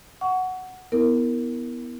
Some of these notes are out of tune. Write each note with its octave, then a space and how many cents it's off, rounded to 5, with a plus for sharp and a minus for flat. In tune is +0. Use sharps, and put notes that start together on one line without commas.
F#5 +0 C#6 +25
B3 +0 E4 -15 A#4 -5